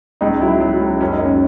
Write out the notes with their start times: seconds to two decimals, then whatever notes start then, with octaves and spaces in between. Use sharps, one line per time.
0.21 C#2 D#4
0.41 F#3 E4
0.60 F#3
0.81 C#2
1.01 F#2 C#4
1.13 D#4
1.21 F#2 C#4